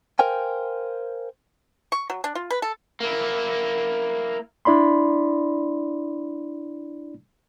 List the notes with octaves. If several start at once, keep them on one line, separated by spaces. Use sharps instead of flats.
A#4 C5 F5 G5 G#5
C#6
F#3
D4
F4
B4
A4
A#3 E4
D4 E4 D5 B5 C6